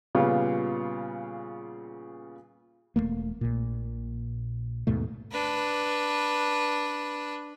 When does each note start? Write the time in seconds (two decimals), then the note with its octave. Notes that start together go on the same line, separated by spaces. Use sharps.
0.15 A#2 C#3 G3 B3 F4
2.96 E1 G2 A3 A#3
3.41 A#1 A#2
4.87 D#2 G#2 B2 A3
5.32 D4 B4